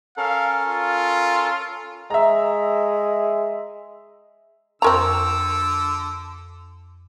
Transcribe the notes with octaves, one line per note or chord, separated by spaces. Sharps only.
C#4 A4 A#4 F5
F4
G#3 E5 A#5
F2 D3 C4 A#4 A#5 C6 C#6 E6